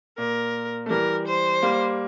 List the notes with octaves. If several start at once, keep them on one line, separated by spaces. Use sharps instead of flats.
A#2 A#4
A3
E3 G3 A#4
C5
G3 A#3